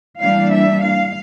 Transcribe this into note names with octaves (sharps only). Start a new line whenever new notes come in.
E3 G3 A#3 D4 F5
E5
F5